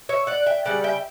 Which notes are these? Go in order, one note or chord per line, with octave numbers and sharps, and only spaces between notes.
C#5 E5
D5 F#5
E5 G5
C#3 G3 D5 F#5
E5 G5